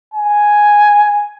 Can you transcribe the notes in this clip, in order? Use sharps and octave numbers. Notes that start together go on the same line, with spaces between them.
G#5